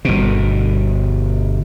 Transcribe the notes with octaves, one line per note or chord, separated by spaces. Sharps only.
G1 B2